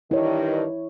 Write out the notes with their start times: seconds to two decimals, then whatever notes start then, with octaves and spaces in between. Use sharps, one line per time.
0.11 G2 D#3 E4 C#5